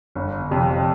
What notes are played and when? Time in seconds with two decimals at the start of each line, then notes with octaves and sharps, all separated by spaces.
0.16 G1
0.51 F2 C3